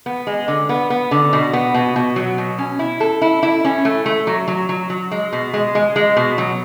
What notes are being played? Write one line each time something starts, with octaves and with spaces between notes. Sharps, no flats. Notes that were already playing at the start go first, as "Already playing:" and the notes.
B3
G#3
D3
B3
B3
D3
B2
B3
B2
B2
F#3
B2
C#4
E4
A4
E4
E4
C#4
A3
A3
F#3
F#3
F#3
F#3
G#3
B2
G#3
G#3
G#3
B2
F#3